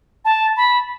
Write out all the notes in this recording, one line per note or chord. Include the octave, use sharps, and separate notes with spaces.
A5
B5